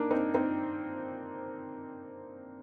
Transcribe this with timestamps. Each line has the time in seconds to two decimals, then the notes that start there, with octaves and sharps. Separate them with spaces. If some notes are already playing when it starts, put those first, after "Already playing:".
Already playing: A#3 D4 D#4
0.11 C4 D#4
0.34 C4 D#4